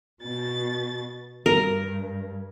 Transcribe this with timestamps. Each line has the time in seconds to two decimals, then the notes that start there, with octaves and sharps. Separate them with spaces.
0.22 B2 A6
1.46 G2 A#4